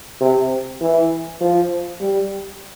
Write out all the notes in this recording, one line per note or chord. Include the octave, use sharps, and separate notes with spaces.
C3
E3
F3
G3